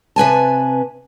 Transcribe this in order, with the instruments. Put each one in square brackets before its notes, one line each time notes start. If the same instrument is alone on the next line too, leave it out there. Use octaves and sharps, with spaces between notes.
[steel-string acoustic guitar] C3 B4 G#5 A5